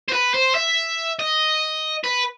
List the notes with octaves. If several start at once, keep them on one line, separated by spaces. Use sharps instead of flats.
C5
B4
C5
E5
D#5
B4